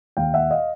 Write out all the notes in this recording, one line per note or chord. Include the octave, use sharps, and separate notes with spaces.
D#2 F5 G5
E5 F#5
D#5 F5